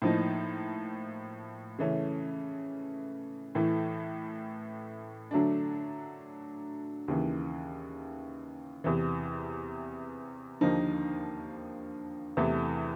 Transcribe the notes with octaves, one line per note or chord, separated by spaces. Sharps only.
A2 F3 A#3 D#4
C#3 E3 A3 C#4
A2 E3 A3
D3 F#3 A3 D4
D#2 C#3 E3
E2 C3 E3
D#2 D3 F3 A#3 D#4
E2 C3 E3 A3